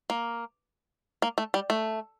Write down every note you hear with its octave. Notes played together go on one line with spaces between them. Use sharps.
A#3
A#3
A3
G3
A3